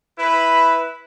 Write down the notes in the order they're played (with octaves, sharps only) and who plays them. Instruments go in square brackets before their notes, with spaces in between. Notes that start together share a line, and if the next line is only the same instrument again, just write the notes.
[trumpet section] E4 B4